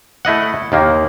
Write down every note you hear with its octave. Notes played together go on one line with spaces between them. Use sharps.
A3 E4 D#5 F#5
D#2 D#3 A#3